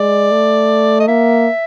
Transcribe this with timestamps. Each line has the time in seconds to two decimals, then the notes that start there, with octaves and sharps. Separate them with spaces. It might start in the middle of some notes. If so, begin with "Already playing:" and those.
Already playing: G#3 D5
0.31 A3
1.00 D#5
1.08 A#3 E5